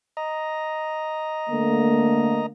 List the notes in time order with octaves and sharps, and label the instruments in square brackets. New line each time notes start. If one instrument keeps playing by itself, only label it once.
[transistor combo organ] D#5 A#5
[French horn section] D3 A3 A#3